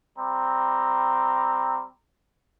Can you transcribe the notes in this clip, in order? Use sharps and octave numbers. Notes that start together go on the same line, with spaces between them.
G3 C4 A#5